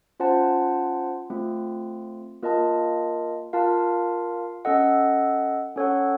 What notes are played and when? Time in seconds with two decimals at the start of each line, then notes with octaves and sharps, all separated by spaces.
0.20 C#4 F4 C5 F#5 A5
1.30 A3 C4 F4
2.42 A#3 F4 A#4 D#5 A5
3.53 F4 A#4 F5 A5
4.65 C#4 A4 D#5 F#5
5.76 C#4 A4 C#5 F#5